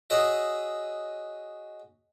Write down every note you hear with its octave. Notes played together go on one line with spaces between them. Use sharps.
F#4 G#4 C#5 D#5 E5